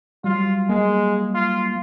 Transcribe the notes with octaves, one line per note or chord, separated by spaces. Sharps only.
F#3 G3 F4
G#3 A#3
F4